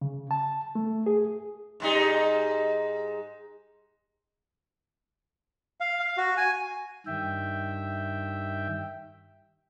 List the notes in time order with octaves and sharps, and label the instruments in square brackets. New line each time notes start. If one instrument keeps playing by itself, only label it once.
[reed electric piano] C#3
A5
A3
G#4
[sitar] G#2 G3 D#4
[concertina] F5
F5
F#4
G#5
[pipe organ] G2 D#3 E5 G5